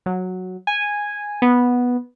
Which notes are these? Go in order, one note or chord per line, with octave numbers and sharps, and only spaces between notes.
F#3
G#5
B3